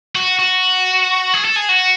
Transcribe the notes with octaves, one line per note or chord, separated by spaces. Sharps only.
F#4
F#4
G#4
A4
G#4
F#4